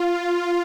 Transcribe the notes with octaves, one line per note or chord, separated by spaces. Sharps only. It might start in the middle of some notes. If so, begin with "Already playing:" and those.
Already playing: F4